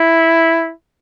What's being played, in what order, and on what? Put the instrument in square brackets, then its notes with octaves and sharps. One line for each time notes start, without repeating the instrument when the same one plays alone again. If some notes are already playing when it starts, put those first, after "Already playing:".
Already playing: [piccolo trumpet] E4